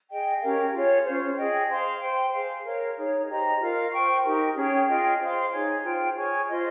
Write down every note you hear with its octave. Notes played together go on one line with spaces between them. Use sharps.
G#4 D#5 G5
C#4 G4 A#4 F5
F4 G#4 C#5
C#4 F4 C5
G#4 D#5 G5
C5 F5 C6
C5 G5 C6
G#4 C5 F5
A#4 C#5 F5
D#4 G#4 C#5
G4 C5 D#5 A#5
F4 A#4 F5
C5 G5 C#6
D#4 G4 A#4
C#4 G#4 C#5 G5
F4 G#4 D#5 G5
C5 F5 C6
D#4 G#4 C#5 G#5
F4 C5 G5
G#4 C#5 G#5 C#6
F4 C5 D#5